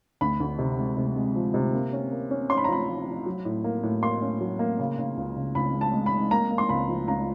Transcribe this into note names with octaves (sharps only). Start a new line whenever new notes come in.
D2 B5
D2
C3
G#3
C3
G#3
F3
C3
A#3
C#4
A#3
C#4
C#4 C6
B5
A#5
F3 B5
F3
F3
F#3
A2
A#3
A2
A#3 C6
C#4
F#3
A#3
C#3
C#3
C#2
C#3
C#2 B5
G#3
A5
G#3
B5
G#3
A#3 A#5
A#3
C6
C#2 B5
F3
C#2 A#5